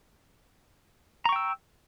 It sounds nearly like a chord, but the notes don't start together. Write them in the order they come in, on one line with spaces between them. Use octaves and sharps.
A#5 C#6 G5 E6